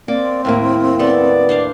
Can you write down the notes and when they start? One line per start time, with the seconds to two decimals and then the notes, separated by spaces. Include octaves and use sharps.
0.08 A#3 C4 D5 D6
0.45 D#2 A2 A#3 A#4
0.99 B3 A4 D5
1.49 D4 C5 F5